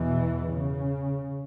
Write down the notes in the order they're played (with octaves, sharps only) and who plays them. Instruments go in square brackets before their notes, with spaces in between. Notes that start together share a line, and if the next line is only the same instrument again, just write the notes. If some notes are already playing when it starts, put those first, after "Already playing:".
Already playing: [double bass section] E2 B2 E3
C#3